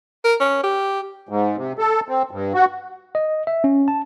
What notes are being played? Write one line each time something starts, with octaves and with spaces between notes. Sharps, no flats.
A#4
C#4
G4
G#2
C3
A4
C4
G2
F#4
D#5
E5
C#4
A5